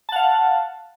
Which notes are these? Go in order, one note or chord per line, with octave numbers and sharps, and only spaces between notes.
F5 F#5 A5